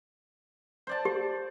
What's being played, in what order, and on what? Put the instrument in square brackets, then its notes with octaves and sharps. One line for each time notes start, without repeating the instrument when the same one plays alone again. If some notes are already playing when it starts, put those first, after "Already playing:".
[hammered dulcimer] C5 D5 A5
[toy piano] G4